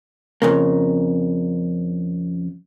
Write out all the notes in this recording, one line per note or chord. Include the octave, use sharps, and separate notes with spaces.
F2 C#3 A#3